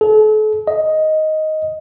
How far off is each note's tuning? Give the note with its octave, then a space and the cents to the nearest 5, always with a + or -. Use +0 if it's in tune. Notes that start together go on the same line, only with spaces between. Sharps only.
A4 -40
D#5 +5